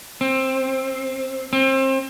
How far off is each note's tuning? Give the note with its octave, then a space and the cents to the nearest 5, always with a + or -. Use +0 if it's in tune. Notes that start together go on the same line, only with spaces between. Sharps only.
C4 +15
C4 +30